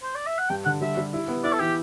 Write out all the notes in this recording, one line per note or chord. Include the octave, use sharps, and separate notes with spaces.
C5
D5
E5
F#5
G2 G5
D3 F#5
G3 E5
G3
E4
B3
E4 D5
A4
E3 G4